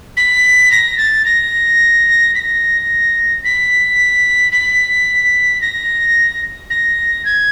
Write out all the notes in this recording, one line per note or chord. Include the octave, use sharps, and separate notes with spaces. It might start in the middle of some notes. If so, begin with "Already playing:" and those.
B6
A#6
A6
A#6
B6
A#6
B6
B6
A#6
A#6
G#6